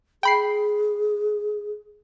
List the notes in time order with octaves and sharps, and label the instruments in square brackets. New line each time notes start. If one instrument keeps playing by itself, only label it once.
[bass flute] G#4 [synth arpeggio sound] G5 B5 C7